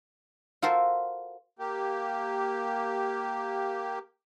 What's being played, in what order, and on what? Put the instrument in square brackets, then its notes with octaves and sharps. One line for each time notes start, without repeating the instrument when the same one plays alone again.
[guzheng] F4 F#4 A4 A#4 C5
[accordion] A#3 G4